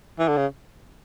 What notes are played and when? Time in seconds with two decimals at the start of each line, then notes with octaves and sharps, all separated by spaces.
0.19 E3
0.28 D3
0.37 C#3